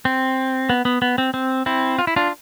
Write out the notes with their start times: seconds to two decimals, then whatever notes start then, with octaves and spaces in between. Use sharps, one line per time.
0.05 C4
0.70 B3
0.85 B3
1.02 B3
1.18 C4
1.34 C4
1.66 C4 E4
1.99 F4
2.07 E4
2.16 D4 F4